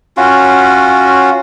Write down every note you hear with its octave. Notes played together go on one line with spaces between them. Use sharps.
C#4 F4 F#4